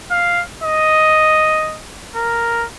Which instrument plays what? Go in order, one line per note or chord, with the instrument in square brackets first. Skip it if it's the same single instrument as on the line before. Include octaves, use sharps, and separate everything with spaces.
[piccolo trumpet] F5
D#5
A#4